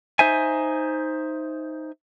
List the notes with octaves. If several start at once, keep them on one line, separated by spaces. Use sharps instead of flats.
D#4 C5 E5 G#5